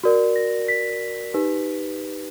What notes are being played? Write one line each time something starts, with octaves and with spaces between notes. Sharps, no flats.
F#4 A#4 D5
A#6
B6
D#4 G4 B4